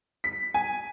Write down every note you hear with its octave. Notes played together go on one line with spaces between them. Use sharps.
B6
G#5